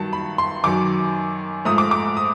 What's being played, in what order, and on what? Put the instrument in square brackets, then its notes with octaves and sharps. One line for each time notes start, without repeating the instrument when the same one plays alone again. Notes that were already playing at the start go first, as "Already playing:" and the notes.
Already playing: [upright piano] G2 D#3 F#3 A5
B5
C6
F#2 D#3 F#3 D6
G#2 F3 A3 D#6
D6
D6
D#6